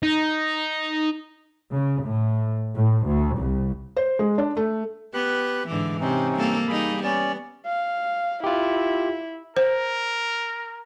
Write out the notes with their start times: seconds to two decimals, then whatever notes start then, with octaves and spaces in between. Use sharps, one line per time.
0.03 D#4
1.71 C#3
2.04 A2
2.75 A2
3.06 D2
3.37 C2
3.97 C5
4.19 G#3
4.38 D4
4.57 A3
5.14 B3 G4 B4 F#6
5.68 G#2 D3 E3 D6
6.00 C3 C4 C#4 D#4
6.35 G3 A#3 A4
6.68 G3 A#3 D#4 G#4 B5
7.04 B3 C#4 D5
7.66 F5
8.44 E4 F4 G4
9.57 A#4 C5